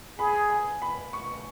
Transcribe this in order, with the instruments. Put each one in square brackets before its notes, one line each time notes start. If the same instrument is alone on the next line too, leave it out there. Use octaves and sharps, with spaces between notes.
[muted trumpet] G#4 [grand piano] B5
[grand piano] G#5
B5
C#6